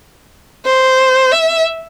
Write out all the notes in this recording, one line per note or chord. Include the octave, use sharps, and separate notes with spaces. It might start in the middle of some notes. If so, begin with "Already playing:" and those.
C5
E5